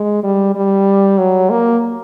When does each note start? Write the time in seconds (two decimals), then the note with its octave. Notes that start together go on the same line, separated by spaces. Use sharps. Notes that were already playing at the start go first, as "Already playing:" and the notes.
Already playing: G#3
0.23 G3
0.55 G3
1.18 F#3
1.50 A#3